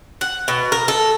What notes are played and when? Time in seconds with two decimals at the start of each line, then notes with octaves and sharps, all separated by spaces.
0.21 F#5
0.48 B2
0.72 A#4
0.88 A4